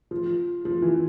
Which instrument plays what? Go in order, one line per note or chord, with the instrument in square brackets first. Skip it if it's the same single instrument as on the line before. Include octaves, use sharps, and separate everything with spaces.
[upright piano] F3
F3
E3